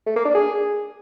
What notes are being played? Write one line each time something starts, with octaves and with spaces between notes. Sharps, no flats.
A3
A#3
D4
G#4